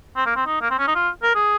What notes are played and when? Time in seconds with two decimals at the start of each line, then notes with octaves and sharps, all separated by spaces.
0.17 C4
0.26 A#3
0.36 C4
0.47 D#4
0.61 A#3
0.71 C4
0.79 C#4
0.87 D#4
0.95 F4
1.23 A#4
1.35 G#4